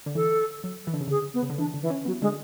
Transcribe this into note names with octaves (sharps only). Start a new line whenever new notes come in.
D3
E3 A4
F#3
E3
D3
C#3
D3 G#4
B3
C#3
D3
E3 D4
D3
E3
C#4
F#3 B3
D3 G#3